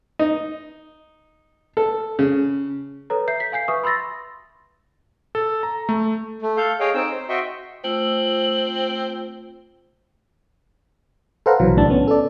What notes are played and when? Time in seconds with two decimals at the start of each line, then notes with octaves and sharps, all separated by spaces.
0.19 D#4
1.77 A4
2.19 C#3
3.10 A4 B4 C#5 A#5
3.28 E5 G6 C7
3.40 B6
3.52 F5 G#5 G6 C7
3.68 B4 E5 C#6 D#6
3.83 B5 C6 E6 A6 A#6
5.35 A4
5.63 A#5
5.89 A3
6.42 A3
6.57 A4 F5 G6
6.80 G#4 C#5 D#5 F5 G5
6.94 C4 D#4 G5 E6
7.11 C5
7.29 F#4 D#5 E5 G5 C6 C#6
7.84 A3 C4 F4 E6 F#7
11.46 A4 B4 C5 F5 F#5 A#5
11.60 B1 C3 E3 F#3
11.77 C2 A2 C#3 D4 A5
11.90 B3 C#4
12.08 A4 D5